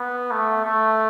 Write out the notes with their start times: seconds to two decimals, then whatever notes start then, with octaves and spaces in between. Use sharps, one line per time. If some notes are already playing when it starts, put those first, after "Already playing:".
Already playing: B3
0.31 A3
0.65 A3